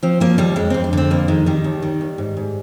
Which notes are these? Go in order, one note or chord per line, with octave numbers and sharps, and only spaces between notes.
F3 C4
F3 A#3
D#2 G3
F2 G#3
F2 C4
D4
D3 C4
F2 A#3
D#3 G#3
D#3 G3
D#2
D#3
D#2
G#2
G#2